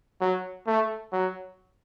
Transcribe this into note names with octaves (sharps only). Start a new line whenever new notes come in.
F#3
A3
F#3